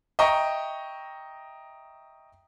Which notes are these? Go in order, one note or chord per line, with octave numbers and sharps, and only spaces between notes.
D#5 E5 G5 A#5 C#6